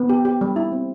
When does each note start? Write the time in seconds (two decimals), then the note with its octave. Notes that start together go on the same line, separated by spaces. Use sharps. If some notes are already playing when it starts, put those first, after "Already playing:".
Already playing: B3
0.09 G4
0.25 G4
0.41 G3
0.56 E4
0.72 C4